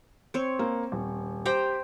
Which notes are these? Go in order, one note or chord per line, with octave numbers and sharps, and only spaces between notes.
C4 C#5
A#3
D#1
G4 C5 G5 A#5